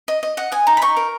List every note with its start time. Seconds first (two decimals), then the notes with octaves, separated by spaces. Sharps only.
0.08 D#5
0.23 D#5
0.37 D#5 F#5
0.52 D#5 G#5
0.67 D#4 A#5
0.77 B5
0.82 D#4 C#6
0.97 A#4